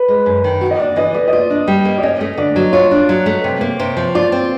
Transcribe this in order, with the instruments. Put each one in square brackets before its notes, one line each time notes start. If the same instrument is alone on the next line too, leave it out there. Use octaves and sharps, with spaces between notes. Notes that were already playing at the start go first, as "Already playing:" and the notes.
Already playing: [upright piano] B4
[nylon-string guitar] G#3
F#2
D#3
F#4
[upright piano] D#5
[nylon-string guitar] D4 [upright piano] D5
[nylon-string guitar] E3 [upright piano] D#5
[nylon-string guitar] A3 [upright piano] D5
[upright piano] D#5
[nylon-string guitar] F4 [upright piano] D5
[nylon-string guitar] D4
G3
A#3
[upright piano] D5
[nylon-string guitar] C#4 [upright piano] D#5
[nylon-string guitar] A3
[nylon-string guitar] D3 [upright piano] D5
[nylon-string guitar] F#3
[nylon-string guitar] F4 [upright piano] C#5
[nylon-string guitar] D4
F#3
A3
C3
A#3
C3
F3
[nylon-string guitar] F4 [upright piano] D5
[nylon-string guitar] C4